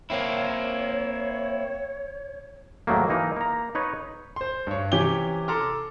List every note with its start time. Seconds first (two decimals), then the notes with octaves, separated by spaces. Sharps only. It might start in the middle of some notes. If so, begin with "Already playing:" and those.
0.10 A#3 C4 E4 C#5
2.87 G#2 D#3 F#3 A3 A#3
3.09 E3 A#3 D#4
3.36 A#3 A#5
3.75 D#4 B4 C#5
4.36 C5 C6
4.67 G2 C#5
4.92 C3 E3 C#4 G4 D6 G7
5.48 A4 A#5 C6 D6 F6